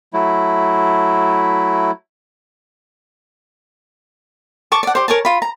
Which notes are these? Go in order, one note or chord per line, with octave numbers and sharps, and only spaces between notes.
F#3 A3 E4
A5 C#6 D6
D5 F#5
G4 C5
A#4 C#5 G#5 A5
F4 B5
A#5